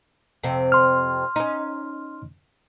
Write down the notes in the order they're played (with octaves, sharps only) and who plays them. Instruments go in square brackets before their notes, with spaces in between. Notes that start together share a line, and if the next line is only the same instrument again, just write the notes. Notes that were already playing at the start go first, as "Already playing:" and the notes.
[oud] F2 C3 C4
[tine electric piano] C6 F6
[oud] C#4 D#4